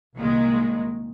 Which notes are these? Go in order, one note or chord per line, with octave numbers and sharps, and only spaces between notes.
C2 A#2 D#3 G#3